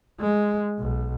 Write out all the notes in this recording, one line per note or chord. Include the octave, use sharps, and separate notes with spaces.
G#3
B1